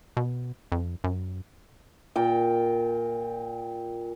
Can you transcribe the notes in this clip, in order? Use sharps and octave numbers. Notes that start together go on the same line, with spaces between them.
B2
F2
F#2
A#2 G5